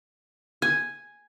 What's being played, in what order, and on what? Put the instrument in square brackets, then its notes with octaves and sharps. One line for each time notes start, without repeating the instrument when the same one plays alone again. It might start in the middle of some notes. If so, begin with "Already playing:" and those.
[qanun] G#5